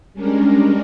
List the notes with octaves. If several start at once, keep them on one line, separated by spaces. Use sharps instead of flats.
G3 G#3 C#4 D4 A#4